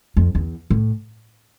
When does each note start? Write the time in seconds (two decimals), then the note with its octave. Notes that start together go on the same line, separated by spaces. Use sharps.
0.16 F2
0.35 E2
0.70 A2